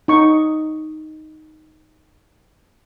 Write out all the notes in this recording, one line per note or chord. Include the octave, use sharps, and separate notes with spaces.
D#4 C#6